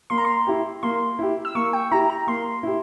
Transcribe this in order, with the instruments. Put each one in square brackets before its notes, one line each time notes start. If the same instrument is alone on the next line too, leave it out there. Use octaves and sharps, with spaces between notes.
[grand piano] A#3 [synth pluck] C6
[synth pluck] A#5
C6
[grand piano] E4 G4
[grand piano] A#3 [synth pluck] C6
[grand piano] E4 G4
[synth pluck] E6
[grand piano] A#3 [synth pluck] C#6
[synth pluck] G5
[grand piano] E4 G4 [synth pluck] A#5
[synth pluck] A#5
[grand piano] A#3 [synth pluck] C6
[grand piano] E4 G4